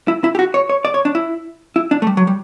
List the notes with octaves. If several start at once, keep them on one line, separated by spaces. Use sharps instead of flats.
E4
E4
G4
F#4
C#5
C#5
D5
C#5
D4
E4
E4
D4
A3
G3
F#3
G3